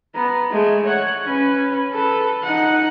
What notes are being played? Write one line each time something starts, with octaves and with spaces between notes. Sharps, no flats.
B3 A#5
G#3 A3
C#5 F#5
C#4 B4
A4 B4
D#4 F#5